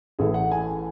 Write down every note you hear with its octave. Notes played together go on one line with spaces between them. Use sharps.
A1 A2 E3 A3 G#4
F#5
G#5